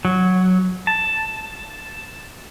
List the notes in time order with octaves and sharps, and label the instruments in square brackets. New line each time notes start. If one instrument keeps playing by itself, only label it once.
[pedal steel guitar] F#3
A5